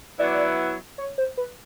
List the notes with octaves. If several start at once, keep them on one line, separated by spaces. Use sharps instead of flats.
F#3 B3 E4 D5
C#5
C5
B4